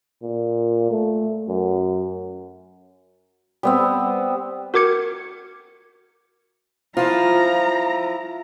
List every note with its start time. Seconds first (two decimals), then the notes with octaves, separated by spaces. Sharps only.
0.22 A#2
0.91 A3
1.49 F#2
3.63 G3 B3 C4
4.74 F#4 A#4 D6 G#6 C#7
6.97 F3 E4 F4 A#5